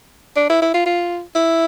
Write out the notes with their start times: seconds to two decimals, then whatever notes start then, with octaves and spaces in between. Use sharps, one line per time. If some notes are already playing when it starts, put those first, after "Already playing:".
0.36 D4
0.49 E4
0.62 E4
0.74 F4
0.86 F4
1.36 E4